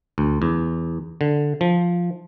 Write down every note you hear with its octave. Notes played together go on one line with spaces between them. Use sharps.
D2
E2
D3
F3